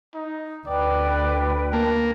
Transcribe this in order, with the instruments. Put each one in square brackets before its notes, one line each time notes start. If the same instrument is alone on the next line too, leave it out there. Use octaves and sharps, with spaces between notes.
[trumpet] D#4
[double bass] D2 [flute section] B4 G5 [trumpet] D5
[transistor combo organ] A#3 [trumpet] A5